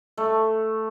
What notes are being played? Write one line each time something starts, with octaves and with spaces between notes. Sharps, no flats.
A3